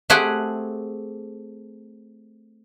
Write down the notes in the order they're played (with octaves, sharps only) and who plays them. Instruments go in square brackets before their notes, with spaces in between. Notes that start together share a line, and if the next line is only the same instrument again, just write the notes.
[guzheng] A3 C4 G4 G#4 F#5 G#5